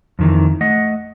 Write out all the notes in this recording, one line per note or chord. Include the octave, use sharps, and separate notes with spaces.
F2 D#3 E3
A3 D#5 F#5